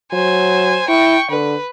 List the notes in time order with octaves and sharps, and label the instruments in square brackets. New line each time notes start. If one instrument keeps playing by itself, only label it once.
[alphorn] F#3 [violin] C5 G#5
[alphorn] E4 [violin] G5 C#6
[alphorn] D3 [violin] B4